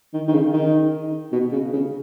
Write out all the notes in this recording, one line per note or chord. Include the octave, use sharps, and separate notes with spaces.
D#3
D#3
C#3
D#3
B2
C#3
C#3